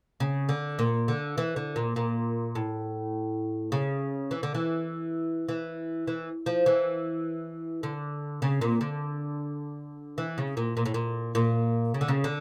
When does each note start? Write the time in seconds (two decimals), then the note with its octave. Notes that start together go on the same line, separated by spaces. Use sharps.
0.20 C#3
0.49 D3
0.79 A#2
1.08 D3
1.38 E3
1.56 D3
1.76 A#2
1.96 A#2
2.55 A2
3.72 C#3
4.31 E3
4.43 D3
4.54 E3
5.49 E3
6.07 E3
6.46 F3
6.66 E3
7.83 D3
8.42 C#3
8.61 A#2
8.81 D3
10.18 E3
10.38 C#3
10.57 A#2
10.77 A#2
10.86 A2
10.94 A#2
11.35 A#2
11.94 C#3
12.01 D3
12.08 C#3
12.24 D3